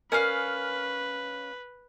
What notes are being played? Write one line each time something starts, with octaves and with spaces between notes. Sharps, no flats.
C#4 A#4 B4 D5 F5 G#5